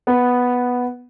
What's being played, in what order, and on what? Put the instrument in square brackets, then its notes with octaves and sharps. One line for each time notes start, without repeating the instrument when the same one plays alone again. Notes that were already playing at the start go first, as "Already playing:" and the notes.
[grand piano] B3